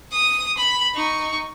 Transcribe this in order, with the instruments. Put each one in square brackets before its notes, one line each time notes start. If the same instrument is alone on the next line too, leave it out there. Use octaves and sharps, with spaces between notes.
[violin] D#6
B5
D#4 C#6